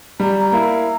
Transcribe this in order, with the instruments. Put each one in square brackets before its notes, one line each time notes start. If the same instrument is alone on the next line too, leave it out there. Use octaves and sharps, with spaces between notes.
[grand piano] G3 [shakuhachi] A#5
[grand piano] A#3 E4